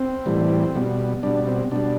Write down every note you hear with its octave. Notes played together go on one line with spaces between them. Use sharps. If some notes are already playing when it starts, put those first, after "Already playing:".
Already playing: C4
A2 E3 G3
B2 G3
B2 G3 D4
C4
B2 G3 D4